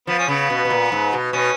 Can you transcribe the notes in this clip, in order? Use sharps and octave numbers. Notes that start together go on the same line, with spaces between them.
F3 B3
C#4
C#3 B3
B2
B2
A#2
G#2
B2
B2 C#4